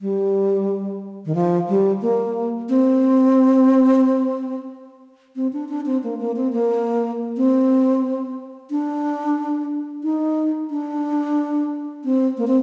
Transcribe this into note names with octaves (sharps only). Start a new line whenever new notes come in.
G3
D#3
F3
G3
A#3
C4
C4
D4
D4
C4
A#3
A#3
C4
A#3
C4
D4
D#4
D4
C4
A#3
C4